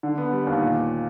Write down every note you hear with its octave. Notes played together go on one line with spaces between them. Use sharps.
D3
B3
G3
D#2
A#2